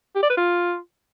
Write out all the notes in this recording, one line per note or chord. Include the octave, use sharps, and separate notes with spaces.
G4
D5
B4
F4